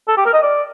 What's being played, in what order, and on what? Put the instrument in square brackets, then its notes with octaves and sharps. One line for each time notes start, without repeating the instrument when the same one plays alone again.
[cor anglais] A4
G4
A#4
D#5
D5